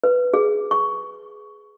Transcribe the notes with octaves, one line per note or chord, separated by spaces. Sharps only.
B4
G#4
C#6